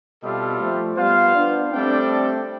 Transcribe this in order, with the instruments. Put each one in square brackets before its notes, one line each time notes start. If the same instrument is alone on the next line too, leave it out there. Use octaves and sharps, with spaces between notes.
[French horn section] B2 [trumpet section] G3 C4 F4 A4 E5
[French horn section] F3 A3
[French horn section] G3 B3 [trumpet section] F4 C5 F5
[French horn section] B3 D4
[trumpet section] G3 D4 A4 D5 G5 [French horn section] A3 C4